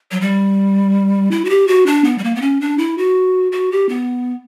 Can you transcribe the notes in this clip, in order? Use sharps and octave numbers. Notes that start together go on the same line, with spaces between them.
F#3
G3
E4
F#4
G4
F#4
D4
B3
G3
A#3
B3
C#4
D4
E4
F#4
F#4
G4
B3